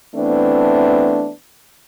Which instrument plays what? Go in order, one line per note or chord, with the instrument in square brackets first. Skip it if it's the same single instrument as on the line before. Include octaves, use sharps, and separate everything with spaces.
[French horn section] E3 A3 B3 C4 D4